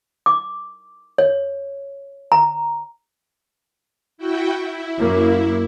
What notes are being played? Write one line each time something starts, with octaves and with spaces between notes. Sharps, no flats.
D6
C#5
A#5
E4 F#4 G5
E4
F#2 A#3